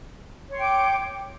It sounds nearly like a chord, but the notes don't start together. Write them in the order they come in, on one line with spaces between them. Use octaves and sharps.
C#5 C6 G5 D6